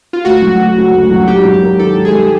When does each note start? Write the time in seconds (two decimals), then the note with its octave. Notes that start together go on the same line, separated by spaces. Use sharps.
0.13 F4
0.25 D2 F#4
0.42 F#3
0.59 D2
0.76 C#3
0.94 D2
1.11 F#3
1.28 G#2 G4
1.45 F#3
1.53 G4
1.62 A#3
1.79 D#3 A4
1.96 G#2
2.05 G#4
2.14 F#3